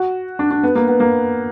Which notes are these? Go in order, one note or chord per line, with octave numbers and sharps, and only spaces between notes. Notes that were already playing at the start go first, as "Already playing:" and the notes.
Already playing: F#4
D4
D4
B3
A#3
B3
A#3